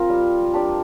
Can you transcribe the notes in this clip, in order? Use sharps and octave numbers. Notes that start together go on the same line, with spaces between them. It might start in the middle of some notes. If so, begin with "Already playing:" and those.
Already playing: C4 F4 A#4
G3
D4 G4 D5